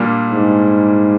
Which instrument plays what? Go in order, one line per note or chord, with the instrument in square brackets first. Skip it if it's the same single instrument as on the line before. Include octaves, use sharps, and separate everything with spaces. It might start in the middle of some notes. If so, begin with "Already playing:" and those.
Already playing: [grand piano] A#2 G3 A#3 D4
[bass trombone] G#2